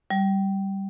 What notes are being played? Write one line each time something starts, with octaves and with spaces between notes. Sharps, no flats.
G3